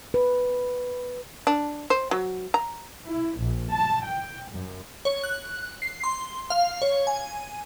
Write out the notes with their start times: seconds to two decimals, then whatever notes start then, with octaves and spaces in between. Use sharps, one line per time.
0.14 B4
1.47 D4
1.90 C5
2.11 F#3
2.54 A#5
3.05 E4
3.36 A#1
3.70 A5
4.02 G5
4.48 F#2
5.05 C#5
5.24 F#6
5.82 C7
6.04 C6
6.50 F5
6.82 C#5
7.07 G#5